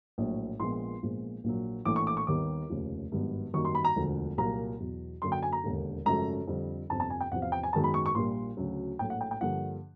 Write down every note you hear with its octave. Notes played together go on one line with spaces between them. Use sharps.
A#1 A2 F#3
A#1 A#2 F3 G#3 B3 C6
A#1 A#2 F3 G#3 B3
A#1 A#2 F#3
A#1 A2 E3 A3 D6
C#6
D6
C#6
D#2 D#3 G3 B3 D6
F1 D#2 C#3 F3
G#1 G2 D#3 F#3 B3
F#2 D#3 G3 A#3 C#6
C6
B5
A#5
E1 D2 D3 F3
C2 A#2 F#3 A#3 A#5
E2 B2 F#3
F#2 D3 F#3 A#3 C6
G5
G#5
A#5
E1 D#2 D3
G#1 F#2 C#3 F3 A3 A#5
F2 D3 G3
G1 F2 C3 A5
A5
G#5
G5
E2 C3 F3 F#5
F5
G5
G#5
F#2 D#3 G#3 B3 A5
B5
C#6
C#6
A#1 A#2 G3 A#3 C6
D2 C#3 F#3
A#1 A2 F#3 A3 G5
F#5
G5
G5
G2 D3 F3 A#3 F#5